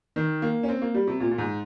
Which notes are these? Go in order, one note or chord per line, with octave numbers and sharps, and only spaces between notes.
D#3
A#3
C#4
C4
A#3
G3
C3
A#2
A#2
G#2